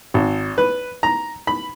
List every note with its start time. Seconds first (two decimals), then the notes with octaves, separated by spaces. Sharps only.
0.14 G#1
0.58 B4
1.03 A#5
1.47 B5